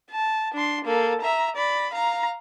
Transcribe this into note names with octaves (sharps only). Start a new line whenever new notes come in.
A5
D4 C6
A#3 A4
E5 A#5
D5 B5
F5 A#5